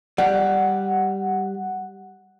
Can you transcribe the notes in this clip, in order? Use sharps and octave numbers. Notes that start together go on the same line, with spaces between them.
G3 F#5